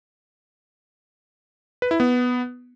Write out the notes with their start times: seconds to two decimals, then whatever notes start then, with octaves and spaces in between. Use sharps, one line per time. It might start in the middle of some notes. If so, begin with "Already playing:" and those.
1.82 B4
1.91 E4
2.00 B3